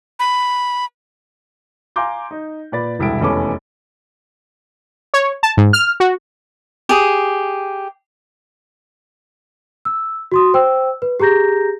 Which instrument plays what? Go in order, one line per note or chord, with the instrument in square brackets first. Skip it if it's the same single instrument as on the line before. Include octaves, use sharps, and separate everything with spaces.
[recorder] B5
[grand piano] F5 G#5 A#5 C6 D6 G6
D#4
A#2 B4 D5 B5 A6
E1 C2 E4 A4 G5 D7
F1 E2 C#4 A4 B5 D6
[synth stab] C#5
A5
G#2
F6
F#4
[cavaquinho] G4 G#4 D#6
[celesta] E6
F#4 C6 D#6
C5 G5 E6
B4
G4 G#4 A#5 G6 A#6